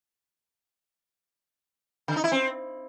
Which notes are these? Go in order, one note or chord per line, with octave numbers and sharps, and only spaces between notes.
D3
D#4
E4
C4